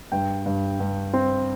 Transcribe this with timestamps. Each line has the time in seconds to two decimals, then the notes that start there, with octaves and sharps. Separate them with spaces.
0.12 G2 G5
0.46 G2
0.80 G2
1.14 C4